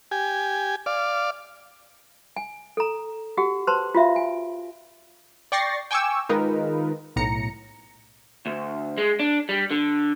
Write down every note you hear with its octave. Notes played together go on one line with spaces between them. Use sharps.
G4 G#5
D5 F5
G#5
A4 A#5
F#4 G4 F#5
B4 C5 A5 C6
F4 F#4 E5 F5
G#5
D5 G5 C#6 A6 A#6 C7
G5 G#5 C#6 D6 E6
D#3 G#3 D#4 F4 A#4 B4
B1 A2 A#5 C#7
D2
G#3
D4
G3
D3